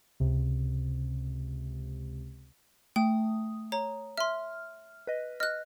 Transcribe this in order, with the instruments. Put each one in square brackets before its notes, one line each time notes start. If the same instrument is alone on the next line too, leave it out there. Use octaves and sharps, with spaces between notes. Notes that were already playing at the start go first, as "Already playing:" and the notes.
[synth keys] C#2 C3
[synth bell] A3 D#6 [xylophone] G5
[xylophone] C#5 A#5
[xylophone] E5 C6 [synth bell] F6
[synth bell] B4 D#5
[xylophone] D#5 F#6 [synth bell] F6